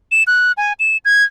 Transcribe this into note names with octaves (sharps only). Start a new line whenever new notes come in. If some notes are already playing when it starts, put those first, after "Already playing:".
E7
F#6
G#5
E7
G#6